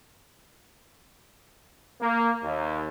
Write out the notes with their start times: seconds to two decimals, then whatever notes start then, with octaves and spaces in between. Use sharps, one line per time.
2.01 A#3
2.44 D#2